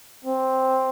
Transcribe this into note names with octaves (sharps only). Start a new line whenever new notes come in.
C4